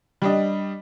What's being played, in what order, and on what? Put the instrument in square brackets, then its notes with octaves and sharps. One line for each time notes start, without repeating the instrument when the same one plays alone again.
[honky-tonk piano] G3 D4 D#5